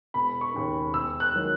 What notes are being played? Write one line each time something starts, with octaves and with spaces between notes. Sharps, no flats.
E1 B5
C#6
D#2 C#3
E1 E6
F#6
D#3 F#3